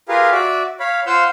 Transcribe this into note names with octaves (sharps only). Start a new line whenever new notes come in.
F4 G4 G#4 A#4 B4 F5
F#4 D5 E5
C#5 F5 B5
F4 C5 F5 F#5 E6 G6